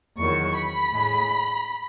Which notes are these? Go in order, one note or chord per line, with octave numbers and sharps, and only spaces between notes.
E2 D#3 F#3 C#6
B5
A2 G#3